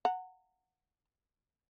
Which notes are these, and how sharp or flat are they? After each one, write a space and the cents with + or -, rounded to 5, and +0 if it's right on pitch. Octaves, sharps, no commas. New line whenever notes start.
F#5 +0 A#5 -35